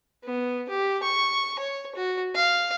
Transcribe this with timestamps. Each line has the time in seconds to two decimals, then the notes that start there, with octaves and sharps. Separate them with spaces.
0.24 B3
0.69 G4
1.03 C#6
1.59 C#5
1.95 F#4
2.35 F5